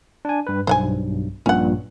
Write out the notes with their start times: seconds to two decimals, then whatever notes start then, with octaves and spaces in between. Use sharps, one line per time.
0.25 D4 G#5
0.47 G2 B4
0.67 B1 G2 C5 F#5 G#5
1.46 A#1 G2 A#2 C#4 F#5